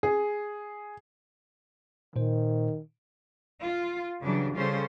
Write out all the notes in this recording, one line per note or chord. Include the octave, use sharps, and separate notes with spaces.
G#4
A#2 D#3 C5
F4
C#3 E3 F#3 G3 D4
C#3 G3 C#4 F4 A4 C5